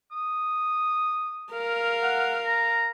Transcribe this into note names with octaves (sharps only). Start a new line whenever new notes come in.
D#6
A#4 F5
F#5
A#5